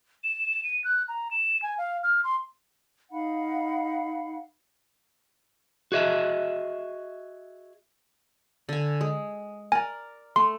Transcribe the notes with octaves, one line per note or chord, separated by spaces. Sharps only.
E7
D#7
F#6
A#5
E7
G#5
F5
F6
C6
D#4 F5 F#5 B5
F#4 G#4 D#5 E5
D3 G#5
G#3
A#4 D5 G#5
A3 C6